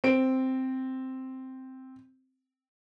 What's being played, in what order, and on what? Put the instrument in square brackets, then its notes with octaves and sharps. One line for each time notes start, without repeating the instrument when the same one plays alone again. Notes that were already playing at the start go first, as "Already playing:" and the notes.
[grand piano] C4 D7